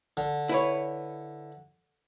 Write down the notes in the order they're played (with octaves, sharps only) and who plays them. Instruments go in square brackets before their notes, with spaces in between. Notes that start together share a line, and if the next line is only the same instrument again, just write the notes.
[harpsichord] D3
[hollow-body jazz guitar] E4 B4 C#5